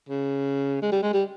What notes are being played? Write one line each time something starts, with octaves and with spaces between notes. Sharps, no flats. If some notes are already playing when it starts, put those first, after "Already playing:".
C#3
G#3
G3
G#3
G3